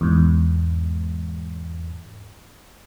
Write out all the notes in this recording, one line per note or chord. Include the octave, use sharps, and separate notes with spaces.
E2 G#2